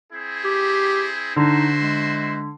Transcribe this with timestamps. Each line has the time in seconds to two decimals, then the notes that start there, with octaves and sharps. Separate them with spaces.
0.13 C4 E4 G#4
0.44 G4
1.36 D3 D#4 E4 F#4 C5
1.81 G#3